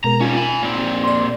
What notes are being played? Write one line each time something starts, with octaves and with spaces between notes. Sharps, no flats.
B2 G#3 A#4 A#5
G3 C#4 D#4 F4
G#5 B5
A#2 C4
D5 C6